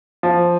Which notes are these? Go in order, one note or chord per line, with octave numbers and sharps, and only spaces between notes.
F3